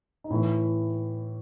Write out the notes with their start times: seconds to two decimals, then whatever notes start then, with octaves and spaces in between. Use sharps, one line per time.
0.24 D#4
0.30 A2 E3 E4